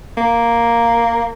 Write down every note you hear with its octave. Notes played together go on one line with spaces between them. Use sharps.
A#3